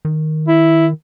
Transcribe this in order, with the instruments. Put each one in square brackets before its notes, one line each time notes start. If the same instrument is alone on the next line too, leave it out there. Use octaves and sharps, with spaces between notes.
[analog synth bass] D#3
[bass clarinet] E4